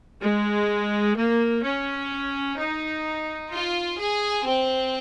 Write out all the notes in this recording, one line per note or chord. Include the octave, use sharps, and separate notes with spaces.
G#3
A#3
C#4
D#4
F4
G#4
C4